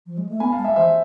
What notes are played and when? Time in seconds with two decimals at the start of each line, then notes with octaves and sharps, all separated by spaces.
0.06 F3
0.17 G#3
0.29 A3
0.40 B3 G#5 B5
0.52 F5 A5
0.58 G#3
0.64 E5 G#5
0.76 E3 C5 E5